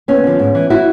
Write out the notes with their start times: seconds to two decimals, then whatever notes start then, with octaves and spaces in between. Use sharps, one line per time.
0.08 D#2 B3 C#4
0.24 D3 F3
0.39 G#2
0.55 E3
0.70 E4 F#4